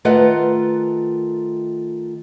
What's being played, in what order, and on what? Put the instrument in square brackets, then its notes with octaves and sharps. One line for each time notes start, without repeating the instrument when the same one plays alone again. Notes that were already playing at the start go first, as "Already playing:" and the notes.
[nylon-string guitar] D#3 A3 F4 B4 D#5 F#5